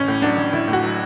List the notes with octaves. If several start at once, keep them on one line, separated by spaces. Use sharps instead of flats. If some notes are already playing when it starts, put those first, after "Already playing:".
Already playing: A1 C#4
A2
F#3 D4
A1
A1 E4
A2
F#4
F#3